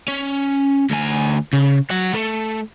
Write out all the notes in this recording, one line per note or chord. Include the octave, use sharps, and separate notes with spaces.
C#4
D2 G#5
C#3
F#3 F#5
A3